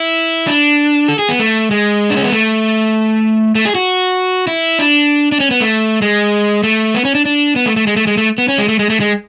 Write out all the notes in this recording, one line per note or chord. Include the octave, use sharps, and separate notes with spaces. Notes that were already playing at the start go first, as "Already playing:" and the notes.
Already playing: E4
D4
A4
G#4
B3
A3
G#3
D4
C#4
B3
A3
A3
G#4
F#4
E4
D4
D4
C#4
B3
A3
G#3
A3
B3
C#4
D4
D4
B3
A3
A3
G#3
A3
G#3
A3
B3
C#4
G#3
A3
G#3
A3
G#3